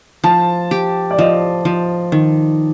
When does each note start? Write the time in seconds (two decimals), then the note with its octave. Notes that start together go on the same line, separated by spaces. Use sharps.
0.24 F3 A5
0.71 G4
1.11 D5
1.19 F3 D#5
1.65 F3
2.12 D#3